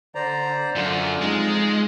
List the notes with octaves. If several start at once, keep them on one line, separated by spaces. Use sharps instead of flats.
D3 C5 D5 A#5
F#2 D3 F4
F2 G#3 D#4